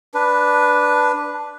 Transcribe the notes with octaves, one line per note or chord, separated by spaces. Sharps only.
D4 B4